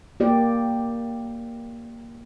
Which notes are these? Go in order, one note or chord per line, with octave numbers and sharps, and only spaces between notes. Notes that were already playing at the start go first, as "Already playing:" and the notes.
A#3 G4 D5